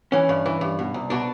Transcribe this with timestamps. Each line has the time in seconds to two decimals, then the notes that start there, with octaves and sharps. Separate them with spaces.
0.12 E3 C#4
0.29 G2
0.46 E3
0.61 G2
0.79 B2
0.94 C2
1.10 B2 D4